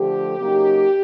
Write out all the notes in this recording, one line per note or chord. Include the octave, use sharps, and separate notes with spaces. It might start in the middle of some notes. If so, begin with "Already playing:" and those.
Already playing: D3 F3 A3 G4
C#3 F#3 A#3 D#4